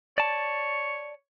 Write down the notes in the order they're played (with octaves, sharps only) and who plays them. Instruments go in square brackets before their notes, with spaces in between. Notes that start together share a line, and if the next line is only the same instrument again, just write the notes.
[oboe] C#5 [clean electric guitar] D5 A5